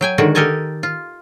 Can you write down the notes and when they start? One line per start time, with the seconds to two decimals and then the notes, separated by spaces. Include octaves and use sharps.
0.01 F#3 G5 G#5
0.18 D3 D#3 G#3 F#4
0.35 G4 A4 A#4 D#5 G#5 A5
0.83 F4